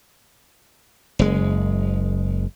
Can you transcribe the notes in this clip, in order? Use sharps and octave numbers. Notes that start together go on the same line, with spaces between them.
F#1 G#3